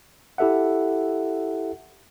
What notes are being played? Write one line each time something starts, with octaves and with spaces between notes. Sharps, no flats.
E4 G4 A4 E5 F#5